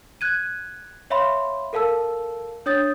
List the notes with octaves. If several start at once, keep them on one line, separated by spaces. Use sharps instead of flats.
F#6 G#6 D#7
C#5 E5 F5 B5 C6
A4 A#4 F5 A5 E6
D4 C#5 D#6 G6 A6